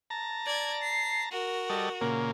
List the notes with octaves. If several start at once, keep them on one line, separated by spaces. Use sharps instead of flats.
A5 A#5
D5 G#6
C7
F#4 A#4
G3 A4 D#5
A#2 C#3 A#3